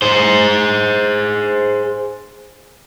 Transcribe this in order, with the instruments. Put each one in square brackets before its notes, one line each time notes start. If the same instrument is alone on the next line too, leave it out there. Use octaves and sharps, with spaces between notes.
[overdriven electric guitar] G#4 C5